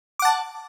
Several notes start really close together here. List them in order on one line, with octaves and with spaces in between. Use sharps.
D6 F#5 A5